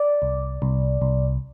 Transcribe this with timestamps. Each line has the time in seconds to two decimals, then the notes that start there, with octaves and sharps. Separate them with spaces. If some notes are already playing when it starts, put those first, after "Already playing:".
Already playing: D5
0.22 C2
0.62 C2
1.01 C2